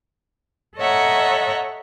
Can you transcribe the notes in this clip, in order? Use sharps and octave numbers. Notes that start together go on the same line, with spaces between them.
A4 C#5 D#5 E5 F#5 A#5